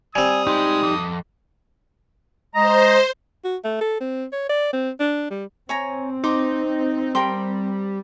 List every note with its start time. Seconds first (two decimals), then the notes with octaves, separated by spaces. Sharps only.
0.15 G3 C4 G#5 D#6
0.47 B1 G#3 D#4 G4
0.83 F2
2.55 G#3 C5 D#5 A#5
3.44 F#4
3.64 A3
3.81 A4
4.00 C4
4.32 C#5
4.49 D5
4.73 C4
5.00 D4
5.30 G3
5.69 C4 C#5 G#5 A#5
6.24 D#4 C6 D6
7.15 G3 A#4 G5 C6